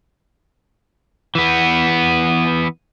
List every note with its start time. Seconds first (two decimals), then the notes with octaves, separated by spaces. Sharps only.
1.35 E3 B3